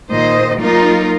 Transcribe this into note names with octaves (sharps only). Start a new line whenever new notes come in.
A#2 D#3 C5 D#5
F#3 A#3 D#4 F4 A#4